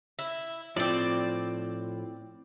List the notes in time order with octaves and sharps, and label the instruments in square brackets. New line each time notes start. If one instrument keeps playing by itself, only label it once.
[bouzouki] E4
[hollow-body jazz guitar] A2 F3 [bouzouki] C4 D5